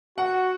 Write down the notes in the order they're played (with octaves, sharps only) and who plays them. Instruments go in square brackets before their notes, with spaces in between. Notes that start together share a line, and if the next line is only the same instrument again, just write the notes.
[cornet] F#4 [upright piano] F#5